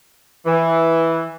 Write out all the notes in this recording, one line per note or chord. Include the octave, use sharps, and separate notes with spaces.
E3